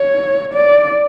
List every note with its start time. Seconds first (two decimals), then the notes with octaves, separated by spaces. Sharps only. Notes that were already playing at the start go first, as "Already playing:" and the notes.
Already playing: C#5
0.53 D5